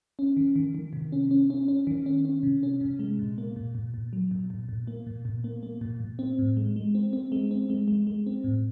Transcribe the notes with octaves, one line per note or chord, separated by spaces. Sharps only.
C#4
D#3
D#3
D#3
C3
C#4
C#4
C#4
C#4
D#3
C#4
C#4
C3
C#4
C3
G#3
A#2
A#3
A#2
A#2
A#2
F#3
A#2
A#2
A#2
A#3
A#2
A#2
A#3
A#3
A#2
A#2
C4
A2
G#3
G#3
C4
C4
G#3
C4
G#3
G#3
G#3
C4
A2